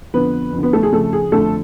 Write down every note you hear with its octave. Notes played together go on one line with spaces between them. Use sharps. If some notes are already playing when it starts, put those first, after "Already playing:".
F2 D3 B3 B4
F2 D3
B3 B4
A3 A4
G#4
F2 C#3 A3 A4
G#4
F2 D3 A3 A4